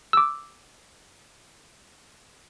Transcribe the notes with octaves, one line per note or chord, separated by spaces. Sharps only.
D6 E6